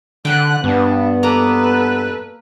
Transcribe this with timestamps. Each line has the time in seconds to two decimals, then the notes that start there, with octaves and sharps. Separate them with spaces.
0.25 D3 B4 F#5 G5 F#6
0.64 G2 B3 D4
1.23 A#3 A4 B4 A#5